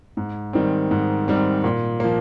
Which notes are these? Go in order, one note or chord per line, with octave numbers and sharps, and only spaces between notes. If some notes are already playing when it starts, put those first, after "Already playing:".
G#2
D#3 G3 C4
G#2
D#3 G3 C4
A#2
F3 A#3